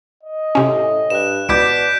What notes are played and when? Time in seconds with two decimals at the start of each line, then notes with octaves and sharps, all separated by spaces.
0.23 D#5
0.55 A2 C3 C#4
1.10 G2 F#6 E7
1.49 C#2 B2 E4 D5 D6 G6 B6 D7